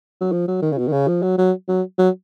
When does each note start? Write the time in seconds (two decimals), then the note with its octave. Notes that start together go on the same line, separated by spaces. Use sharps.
0.21 F#3
0.32 F3
0.48 F#3
0.62 D#3
0.72 C#3
0.78 B2
0.88 D#3
0.92 C#3
1.08 F3
1.22 F#3
1.38 F#3
1.68 F#3
1.98 F#3